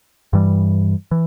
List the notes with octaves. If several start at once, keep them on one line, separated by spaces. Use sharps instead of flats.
G2 E3 G3
E3